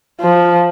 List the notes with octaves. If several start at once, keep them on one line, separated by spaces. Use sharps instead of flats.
F3